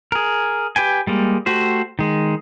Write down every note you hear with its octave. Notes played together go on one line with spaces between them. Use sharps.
G#4 A#4
G4 B4 G5 G#5
G3 G#3 A#3
A3 F#4 G4 C5
D#3 G#3